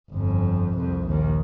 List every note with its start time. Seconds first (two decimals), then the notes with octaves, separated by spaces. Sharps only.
0.11 G1 F2
0.74 C2 F2
1.07 A#1 D#2